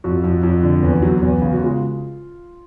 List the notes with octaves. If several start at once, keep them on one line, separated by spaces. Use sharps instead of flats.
F2 F#4
F2
F2
D3
E2
F#3
E2
C#3
F#4
G#3 F4